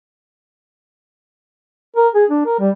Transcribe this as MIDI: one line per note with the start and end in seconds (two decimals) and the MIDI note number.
1.96 2.08 70
2.15 2.25 68
2.29 2.42 62
2.45 2.55 70
2.59 2.70 55